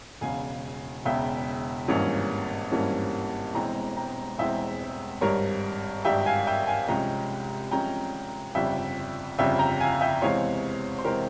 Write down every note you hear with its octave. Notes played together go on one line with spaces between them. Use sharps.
E1 E2 C#3 F5 G#5
E1 E2 C#3 E5 G5
G#1 G2 E3 A#3 C#4
G#1 G2 E3 A#3 C#4
E1 E2 E3 G#3 C4 G5 A#5
G5 A#5
E1 E2 E3 G#3 C4 E5 G5
G#1 G2 G3 A#4 C#5
G#1 G2 G3 E5 G5
F5 G#5
E5 G5
F5 G#5
C2 C3 F3 G#3 C#4 G5 A#5
C2 C3 F3 G#3 C#4 G5 A#5
G1 F2 C#3 G3 E5 G5
G1 F2 C#3 G3 E5 G5
G5 A#5
F5 G#5
E5 G5
E2 C3 E3 G#3 C4 C#5 F5
C5
C3 E3 G#3 C4 G4 A#4